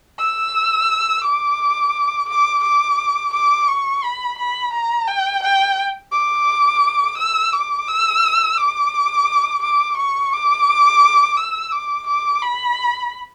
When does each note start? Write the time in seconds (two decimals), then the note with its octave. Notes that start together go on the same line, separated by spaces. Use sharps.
0.19 E6
1.24 D6
2.29 D6
2.63 D6
3.34 D6
3.68 C#6
4.04 B5
4.38 B5
4.73 A#5
5.08 G5
5.43 G5
6.13 D6
7.18 E6
7.53 D6
7.88 E6
8.58 D6
9.62 D6
9.97 C#6
10.32 D6
11.37 E6
11.72 D6
12.07 D6
12.42 B5